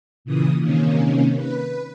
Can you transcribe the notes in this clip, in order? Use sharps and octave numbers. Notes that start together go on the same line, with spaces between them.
A#2 C#3 E3 D#6
C3 D#3 A#3 C#4
B4